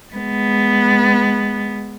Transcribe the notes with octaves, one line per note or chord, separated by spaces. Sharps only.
G#3 B3